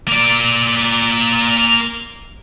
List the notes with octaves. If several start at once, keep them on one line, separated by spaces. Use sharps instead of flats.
A#3 D5